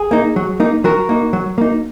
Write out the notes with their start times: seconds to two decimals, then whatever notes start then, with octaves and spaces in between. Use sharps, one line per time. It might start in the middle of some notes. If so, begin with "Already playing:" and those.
Already playing: G#4
0.11 A#3 D#4
0.36 F#3
0.60 A#3 D#4
0.84 F#3 F#4 A#4
1.09 A#3 D#4
1.33 F#3
1.58 A#3 D#4